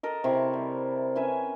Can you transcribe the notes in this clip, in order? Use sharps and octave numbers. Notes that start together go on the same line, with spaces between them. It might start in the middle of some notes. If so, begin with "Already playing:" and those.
A4 A#4 D#5
C3 E4 C#6
G3
C#4 B4 E5 G#5